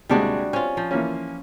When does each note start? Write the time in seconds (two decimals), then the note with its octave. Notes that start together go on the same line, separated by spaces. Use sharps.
0.09 D#2 C3 G3 G#3 D4 F#4
0.53 C4 C#4 F4
0.77 F3
0.91 E3 A#3 C#4